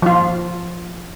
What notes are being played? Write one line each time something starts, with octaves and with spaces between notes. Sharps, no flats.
F3 F4